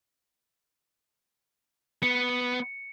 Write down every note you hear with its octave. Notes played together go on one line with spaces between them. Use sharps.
B3 C#7